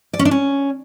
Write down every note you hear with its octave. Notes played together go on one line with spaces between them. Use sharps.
D5
C#4
D4
C#4